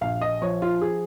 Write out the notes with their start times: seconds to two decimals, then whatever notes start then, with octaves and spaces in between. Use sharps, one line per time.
0.01 A#1 F5
0.21 D#5
0.41 F3 C#5
0.62 F4
0.81 G#4